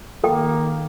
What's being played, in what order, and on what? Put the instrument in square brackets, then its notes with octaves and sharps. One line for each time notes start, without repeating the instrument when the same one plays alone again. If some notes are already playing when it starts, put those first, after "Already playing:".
[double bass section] D#3 [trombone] A#3 [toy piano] A4 G5